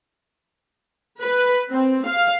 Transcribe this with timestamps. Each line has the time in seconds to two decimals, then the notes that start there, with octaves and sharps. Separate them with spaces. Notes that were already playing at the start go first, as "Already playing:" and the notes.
1.22 B4
1.71 C4
2.07 F5